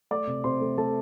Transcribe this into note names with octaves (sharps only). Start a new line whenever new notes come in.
A3 D5 D6
C3
C3 C5 C6
A3
A3 A4 A5